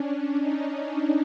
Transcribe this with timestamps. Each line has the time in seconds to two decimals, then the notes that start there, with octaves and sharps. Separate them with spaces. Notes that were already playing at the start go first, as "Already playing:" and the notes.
Already playing: C#4 D4
0.11 D4
0.40 D#4